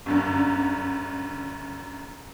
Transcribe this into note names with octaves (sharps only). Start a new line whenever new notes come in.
G1 F#2 D3